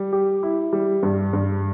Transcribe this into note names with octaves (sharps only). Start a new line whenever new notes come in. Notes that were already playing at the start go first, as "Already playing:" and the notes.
Already playing: G3
G4
E4
G3
G2
G2